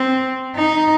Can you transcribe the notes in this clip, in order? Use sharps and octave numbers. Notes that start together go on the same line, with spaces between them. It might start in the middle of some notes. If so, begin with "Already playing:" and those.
Already playing: C4
D#4